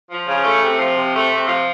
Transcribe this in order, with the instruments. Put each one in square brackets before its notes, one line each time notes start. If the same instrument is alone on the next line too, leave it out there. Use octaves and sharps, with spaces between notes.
[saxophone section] F3
C#3
A3
C3
F3
C3
A3
C3
F3